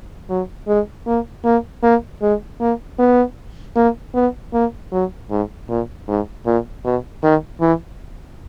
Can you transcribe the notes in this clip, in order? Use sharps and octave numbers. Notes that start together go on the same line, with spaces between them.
F#3
G#3
A#3
A#3
A#3
G#3
A#3
B3
A#3
B3
A#3
F#3
G#2
A#2
G#2
A#2
B2
D#3
E3